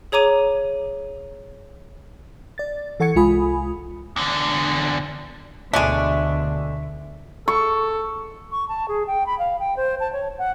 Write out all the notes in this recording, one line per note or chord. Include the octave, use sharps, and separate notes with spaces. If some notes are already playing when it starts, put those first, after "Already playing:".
G#4 C#5 A#5 D6 D#7
D5 A6
E3 A4 F#5 C#6 G#6 C#7
C2 G#3 F4 G#5 B5 D#6
E2 D3
D2 B2 D3 G#3 D4 E5 C#6 D6
A4 C#6
C#6
A5
G#4
G5
B5
F5
G5
C5
A5
C#5
F#5